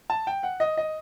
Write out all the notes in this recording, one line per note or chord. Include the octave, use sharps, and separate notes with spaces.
A5
G5
F#5
D#5
D#5